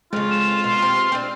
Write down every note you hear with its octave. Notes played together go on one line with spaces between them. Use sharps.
F2 C#3 G#3 F4
E7
B2 C6
C4 G4
C4 D4